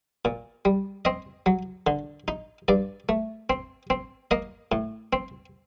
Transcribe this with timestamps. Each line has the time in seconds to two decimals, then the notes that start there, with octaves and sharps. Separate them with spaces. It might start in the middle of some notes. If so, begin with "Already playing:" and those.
0.25 A#2
0.65 G3
1.05 C4 D#5
1.46 F#3
1.87 D3
2.28 D#4
2.68 G2 D5
3.09 A3
3.50 C4
3.90 C4
4.31 A#3 D#5
4.72 A2
5.13 C4